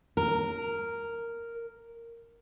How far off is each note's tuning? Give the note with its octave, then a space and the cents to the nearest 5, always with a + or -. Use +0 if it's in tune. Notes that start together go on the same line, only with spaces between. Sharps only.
A#4 -5